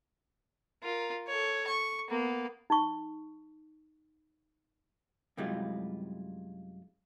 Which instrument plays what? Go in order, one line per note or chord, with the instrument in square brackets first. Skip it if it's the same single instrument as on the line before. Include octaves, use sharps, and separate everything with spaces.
[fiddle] F4 A#4
A4 C#5
C#6
A#3 B3
[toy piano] D#4 C#6
[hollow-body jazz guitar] F#2 C3 G3 G#3 E4 F4